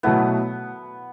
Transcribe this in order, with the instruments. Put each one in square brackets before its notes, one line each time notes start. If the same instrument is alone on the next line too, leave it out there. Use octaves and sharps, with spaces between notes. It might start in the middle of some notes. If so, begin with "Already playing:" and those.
[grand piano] B2 F#3 A3 E4 [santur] B3